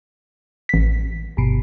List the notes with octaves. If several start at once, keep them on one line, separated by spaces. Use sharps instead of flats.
A1 B6
G1 B2